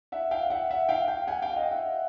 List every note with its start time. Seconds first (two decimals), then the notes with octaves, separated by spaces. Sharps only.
0.12 E5 F#5
0.31 F5 G5
0.50 E5 F#5
0.71 E5 F#5
0.89 F5 G5
1.08 F5 G5
1.27 F#5 G#5
1.42 F5 G5
1.56 D#5 F5
1.71 E5 F#5